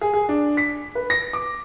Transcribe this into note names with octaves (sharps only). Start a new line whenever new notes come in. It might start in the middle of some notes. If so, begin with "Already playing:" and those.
G#4
G#4
D4
B6
B4
A#6
D6